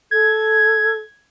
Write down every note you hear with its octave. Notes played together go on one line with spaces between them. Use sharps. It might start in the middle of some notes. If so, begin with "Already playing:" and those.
A4 G#6